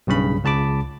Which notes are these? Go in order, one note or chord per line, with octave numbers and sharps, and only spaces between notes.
B1 G2 C#3 B5
C#2 C#3 A5 B5 D6